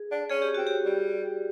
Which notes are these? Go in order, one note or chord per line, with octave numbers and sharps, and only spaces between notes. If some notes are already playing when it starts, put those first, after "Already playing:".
Already playing: G#4
D4
C#4 G#4
G4
C4 F#4
G4
G3